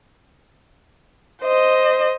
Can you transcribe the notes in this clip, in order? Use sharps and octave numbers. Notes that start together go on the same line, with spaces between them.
C5 D#5